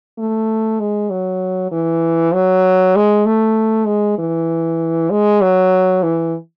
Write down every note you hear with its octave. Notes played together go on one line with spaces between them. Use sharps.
A3
G#3
F#3
E3
F#3
G#3
A3
G#3
E3
G#3
F#3
E3